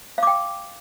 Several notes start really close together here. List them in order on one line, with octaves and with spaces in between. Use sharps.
F5 D6 G5